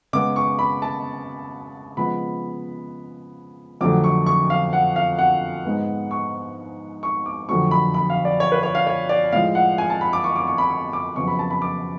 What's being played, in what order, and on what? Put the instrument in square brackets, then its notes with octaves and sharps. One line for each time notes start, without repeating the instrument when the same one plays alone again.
[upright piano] C#3 G#3 B3 D6
C#6
B5
A5
C#3 F3 G#3 B3 B5
F2 D3 F#3 A3 D6
C#6
C#6
F5
F#5
F5
F#5
G#2 G#3 B3
C#6
C#6
D6
F2 D3 F#3 A3 C#6
B5
B5
F5
D5
C#5
B4
C#5
F5
C#5
D5
A2 F3 G#3 F5
F#5
G#5
A5
B5
D6
C#6
D6
C#6
B5
C#6
D6
F2 C#3 F#3 B3 C#6
B5
A5
B5
D6